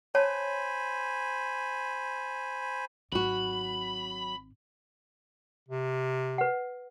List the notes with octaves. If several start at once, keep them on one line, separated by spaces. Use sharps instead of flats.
C5 C#5 G#5 A5 B5
G#1 F#3 C4 F#4 B5
C3
B4 F#5